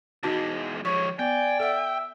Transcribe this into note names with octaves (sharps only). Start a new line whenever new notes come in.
E2 G#3 D#4 F#4 A5
F3 G#3 C#5 C#6
B3 D5 G5 G#5
A4 E5 F#5